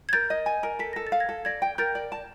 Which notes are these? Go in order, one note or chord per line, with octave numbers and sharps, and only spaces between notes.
G#6
A#4 G6 A6
D#5
G#5
A#4
A4 B6
A4 A#6
A6
F5
G#6 A#6
A4
D5 G#6 A#6
G5
A#4 G6 A6
D5
A5